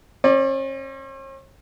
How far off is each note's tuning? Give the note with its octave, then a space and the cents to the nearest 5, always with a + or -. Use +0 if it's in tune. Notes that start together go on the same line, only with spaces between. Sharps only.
C#4 -45 D5 +0